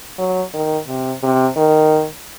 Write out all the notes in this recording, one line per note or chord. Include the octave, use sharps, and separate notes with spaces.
F#3
D#3
C3
C3
D#3